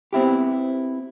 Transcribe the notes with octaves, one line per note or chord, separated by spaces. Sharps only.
B3 C4 E4 G4